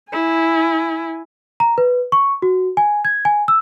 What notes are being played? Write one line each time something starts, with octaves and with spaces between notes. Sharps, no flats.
E4 G#5
A#5
B4
C#6
F#4
G#5
G#6
G#5
E6